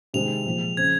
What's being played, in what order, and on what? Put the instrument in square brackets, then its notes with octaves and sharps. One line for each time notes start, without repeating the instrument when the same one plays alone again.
[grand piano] C3 D#3 G#3 C4 [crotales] F7
[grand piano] A#2 F3 G#3
[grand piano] C#3 F3 C4 [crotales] G#6